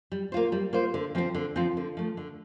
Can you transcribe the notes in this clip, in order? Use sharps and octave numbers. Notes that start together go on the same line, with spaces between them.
G3
A#3 F4 C5
G3
A#3 F4 C5
D3
F3 C4 F4 C5
D3
F3 C4 F4 C5
D3
F3 A3
D3